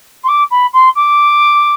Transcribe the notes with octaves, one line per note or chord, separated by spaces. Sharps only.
C6
D6
B5
C6
D6